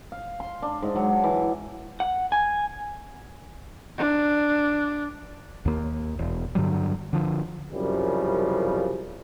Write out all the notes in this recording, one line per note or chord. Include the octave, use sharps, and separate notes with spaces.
F5
C6
D4
G#2
F#3
E3
F#5
G#5
D4
D#2 A#3
E1
G2 D3 F#3 G3
D3 F3
C2 F#2 C#3 F3 G3